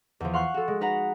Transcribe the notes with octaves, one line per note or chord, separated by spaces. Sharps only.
E2 F3
F5 F#5 C6 C#6 F6 F#6
F#4 A4
G#3
D#4 B4 F#5 A#5